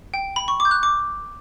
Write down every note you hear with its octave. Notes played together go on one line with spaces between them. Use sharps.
G5
B5
C#6
D6
G6
F#6
D6